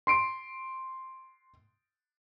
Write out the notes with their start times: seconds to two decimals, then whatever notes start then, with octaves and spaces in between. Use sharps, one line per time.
0.07 C6 C7 D7